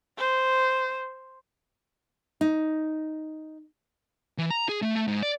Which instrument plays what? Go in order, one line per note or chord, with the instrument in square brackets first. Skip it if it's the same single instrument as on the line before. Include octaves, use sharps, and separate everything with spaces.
[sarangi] C5
[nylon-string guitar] D#4
[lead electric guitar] E3
A#5
G#4
A3
A3
G#2
D5